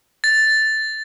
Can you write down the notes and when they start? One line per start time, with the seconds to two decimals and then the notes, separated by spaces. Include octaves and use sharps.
0.24 A6